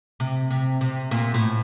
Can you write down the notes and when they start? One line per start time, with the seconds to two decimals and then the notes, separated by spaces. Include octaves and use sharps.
0.20 C3
0.51 C3
0.81 C3
1.11 A#2
1.34 A2